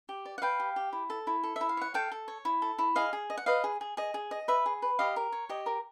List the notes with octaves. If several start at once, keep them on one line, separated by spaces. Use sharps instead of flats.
G4
D5
F#5
B4 F5 G5
G4
G4
E4
A4
E4
A4
E4 E5
F5
C#5 F#5
A4 F5 G5
A4
C#5
E4
A4
E4
G#4 D#5 F5
G#4
D#5
F#5
B4 D#5 F5
G#4
G#4
G#4 D#5
G#4
D#5
B4 E5
G#4
B4
G4 D#5 F5
A#4
C#5
G4 D#5
A#4